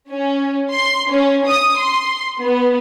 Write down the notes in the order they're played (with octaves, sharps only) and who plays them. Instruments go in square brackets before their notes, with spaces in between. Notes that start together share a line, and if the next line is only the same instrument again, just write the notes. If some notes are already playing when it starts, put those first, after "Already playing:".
[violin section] C#4
C6
C#4
D#6
C6
B3